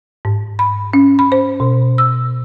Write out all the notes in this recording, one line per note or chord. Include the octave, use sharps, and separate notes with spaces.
G#2
B5
C#4
B5
C5
B2
E6